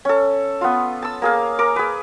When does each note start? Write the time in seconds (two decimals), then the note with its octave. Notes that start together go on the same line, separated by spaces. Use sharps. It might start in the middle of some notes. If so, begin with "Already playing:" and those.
0.05 C#4 A4
0.61 B3 F4
1.02 A5 E6
1.22 A#3 G#4 F5
1.59 A#4 A#5 D6
1.76 G#4 B4